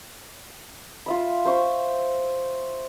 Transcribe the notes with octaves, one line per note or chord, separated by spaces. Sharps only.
F4 E5 B5
C5 E5 C#6